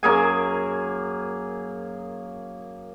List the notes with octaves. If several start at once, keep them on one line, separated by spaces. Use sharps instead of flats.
F#2 A#3 G#4 G#5